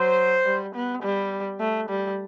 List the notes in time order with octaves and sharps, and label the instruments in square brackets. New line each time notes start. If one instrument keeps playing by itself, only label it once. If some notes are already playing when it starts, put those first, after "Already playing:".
Already playing: [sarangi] F#3 [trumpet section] C5
[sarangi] G3
B3
G3
A3
G3